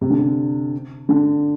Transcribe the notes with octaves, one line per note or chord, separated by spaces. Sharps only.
C3
D3
C3
D3